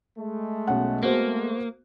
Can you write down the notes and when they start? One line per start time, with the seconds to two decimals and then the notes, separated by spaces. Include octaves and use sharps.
0.19 G#3 A3
0.67 B1 C#4 F#5
1.03 A#3 B3 F#4 C5